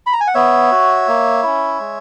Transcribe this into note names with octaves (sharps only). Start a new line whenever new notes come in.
B5
A#5
G#5
F#5
B3 C#5 E5
F#4
A#3
C#4 E4
G#3